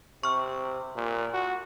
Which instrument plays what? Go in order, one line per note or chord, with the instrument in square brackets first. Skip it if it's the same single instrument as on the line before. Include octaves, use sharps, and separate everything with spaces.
[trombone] C3 [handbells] C#6 F6
[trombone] A#2
F#4